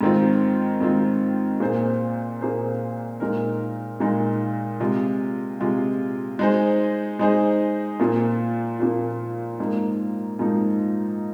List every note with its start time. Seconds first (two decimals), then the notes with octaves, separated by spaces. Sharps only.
0.01 G#2 D#3 C4 F4
0.81 G#2 D#3 C4 F4
1.60 A#2 A#3 G#4 C5
2.41 A#2 A#3 G#4 C5
3.20 A#2 G#3 D#4 A#4
4.00 A#2 G#3 D#4 A#4
4.80 C3 G#3 F4
5.60 C3 G#3 F4
6.39 G#3 D#4 G#4 C5
7.19 G#3 D#4 G#4 C5
8.00 A#2 F3 A#3 F4
8.79 A#2 F3 A#3 F4
9.59 G#2 F3 A#3 D#4
10.39 G#2 F3 A#3 D#4